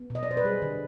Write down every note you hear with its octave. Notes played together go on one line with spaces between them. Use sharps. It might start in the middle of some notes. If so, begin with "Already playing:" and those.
Already playing: B3
B2
D#5
D5
B2 C5
B4
G3 G#4
D3